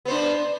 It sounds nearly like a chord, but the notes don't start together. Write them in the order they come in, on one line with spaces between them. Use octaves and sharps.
B3 C5 D4